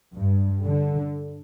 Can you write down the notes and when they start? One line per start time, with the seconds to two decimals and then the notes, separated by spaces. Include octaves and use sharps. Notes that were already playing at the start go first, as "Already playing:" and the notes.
0.14 G2
0.65 D3